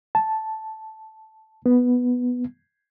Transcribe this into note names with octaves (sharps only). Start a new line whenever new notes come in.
A5
B3